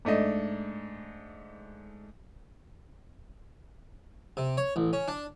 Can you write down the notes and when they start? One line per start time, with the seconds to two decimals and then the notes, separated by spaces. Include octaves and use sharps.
0.05 G#2 A3 D4 D#5
4.37 C3
4.57 C#5
4.76 A1
4.93 C#4
5.08 D4